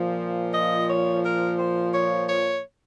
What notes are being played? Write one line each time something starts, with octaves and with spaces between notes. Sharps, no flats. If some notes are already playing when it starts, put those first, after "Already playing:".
Already playing: A#2 F3
D#5
C#5
A#4
C5
C#5
C#5